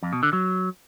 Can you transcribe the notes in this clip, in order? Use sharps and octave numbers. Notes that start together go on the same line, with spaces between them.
F2
B2
D3
F#3